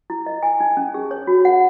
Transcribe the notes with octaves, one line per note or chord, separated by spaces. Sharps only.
E4
D#5
G#5
D#4
C#4
G#4
C#5
F#4
F#5